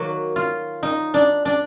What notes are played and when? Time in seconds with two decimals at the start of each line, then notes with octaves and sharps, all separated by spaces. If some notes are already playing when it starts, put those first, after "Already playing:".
Already playing: D#3 F#3 A#3 F#4
0.36 F4
0.83 D#4
1.14 D4
1.45 D4